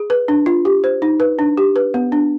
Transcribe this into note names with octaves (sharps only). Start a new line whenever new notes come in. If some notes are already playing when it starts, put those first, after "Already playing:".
Already playing: G#4
B4
D4
F4
G4
C5
D#4
B4
D4
G4
B4
B3
D4